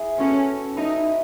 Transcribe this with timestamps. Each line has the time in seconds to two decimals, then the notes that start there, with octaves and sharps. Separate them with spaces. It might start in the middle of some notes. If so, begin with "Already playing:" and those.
Already playing: E4 G#4
0.18 B3 C#4 F#4 A4 C#5
0.76 D#4 E4 B4 D#5